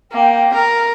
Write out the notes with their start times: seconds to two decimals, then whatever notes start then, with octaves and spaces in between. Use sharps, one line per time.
0.12 A#3 G5
0.54 A#4